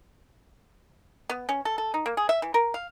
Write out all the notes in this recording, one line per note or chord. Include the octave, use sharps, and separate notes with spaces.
B3
C#4
A4
A4
D#4
A#3
G#4
E5
E3
A#4
F5